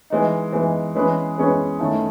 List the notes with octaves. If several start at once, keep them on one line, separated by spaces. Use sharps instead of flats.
E3 G#3 D#4
E3 G#3 D#4
E3 G#3 C#4 G#4 B4
E3 G#3 C#4 G#4 B4
D#3 A3 C#4 E4 A4